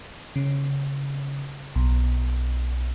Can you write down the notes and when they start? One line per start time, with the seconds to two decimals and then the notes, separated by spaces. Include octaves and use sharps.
0.36 C#3
1.75 B1